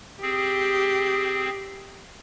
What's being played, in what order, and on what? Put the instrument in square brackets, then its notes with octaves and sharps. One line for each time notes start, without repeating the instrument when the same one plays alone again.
[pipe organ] C4 G#4 [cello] G4